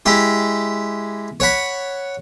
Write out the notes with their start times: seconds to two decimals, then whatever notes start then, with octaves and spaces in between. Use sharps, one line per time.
0.06 G#3 E4 G4
1.40 C#5 F#5 B5